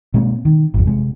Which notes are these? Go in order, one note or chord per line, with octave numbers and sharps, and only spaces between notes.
B2 G#3 A#3 C4
D#3
G#1 F2
C3 G#3